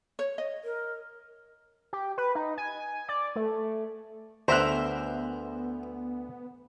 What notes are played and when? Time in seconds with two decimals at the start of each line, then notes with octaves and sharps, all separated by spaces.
0.19 C#5
0.38 D#5
0.64 A#4
1.93 G4
2.18 B4
2.35 D#4
2.58 G#5
3.09 D5
3.36 A3
4.48 D2 D3 B3 A#4 C5 E5 A#5 F#6